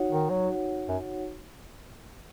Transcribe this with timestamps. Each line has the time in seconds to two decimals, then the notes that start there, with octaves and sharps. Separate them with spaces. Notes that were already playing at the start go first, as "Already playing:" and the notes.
Already playing: D#4 F#4 C#5 F#5
0.12 D#3
0.30 F#3
0.88 F#2